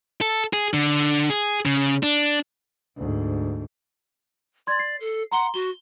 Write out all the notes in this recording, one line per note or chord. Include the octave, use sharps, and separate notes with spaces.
A4
G#4
D3
G#4
C#3
D4
D2 G#2
D5 C6 G#6
C7
A4
F#5 A#5 C6 G7
F#4 G7